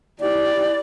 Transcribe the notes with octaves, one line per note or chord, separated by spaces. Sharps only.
E4 G4 D5